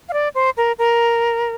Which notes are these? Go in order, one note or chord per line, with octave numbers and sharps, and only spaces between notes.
F5
D5
C5
A#4
A#4